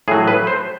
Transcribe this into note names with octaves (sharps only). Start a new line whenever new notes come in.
A2 F#3 G#4
B4
C5